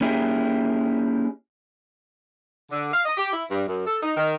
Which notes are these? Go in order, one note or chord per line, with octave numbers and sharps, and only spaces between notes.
A#3 C#4 D#4 E4 G4 G#4
D3
F5
D#5
G4
E4
G2
F#2
A4
D#4
D#3